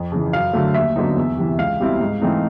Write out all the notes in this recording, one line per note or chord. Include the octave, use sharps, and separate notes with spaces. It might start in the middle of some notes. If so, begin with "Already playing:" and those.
Already playing: F2
C#3 E3
F#2 F5
D3 F#3 A3
D#2 E5
D3 F#3 B3 D#4
E2
C3 E3
C#2 F5
B2 G3 C4 E4
G#2
E3 A3 C4 D#4